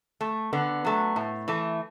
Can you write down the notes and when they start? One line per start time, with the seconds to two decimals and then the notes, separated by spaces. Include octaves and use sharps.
0.21 A3
0.53 D3 B3
0.85 F#3 A3
1.16 A2
1.48 E3 A3